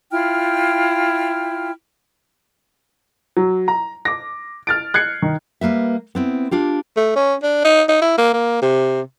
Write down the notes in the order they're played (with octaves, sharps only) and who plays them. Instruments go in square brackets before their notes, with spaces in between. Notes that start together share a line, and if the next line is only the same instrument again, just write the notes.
[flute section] E4 F4 G5 F6
[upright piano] F#3
A#5
D6 A#6
F6 A6 D7
F#6 G#6 C7 C#7
D#3
[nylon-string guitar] G3 A#3 B4 E5
B3 C4 E4
D4 F4 G4
[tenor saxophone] A3
C#4
D4
D#4
D#4
E4
A#3
A#3
C3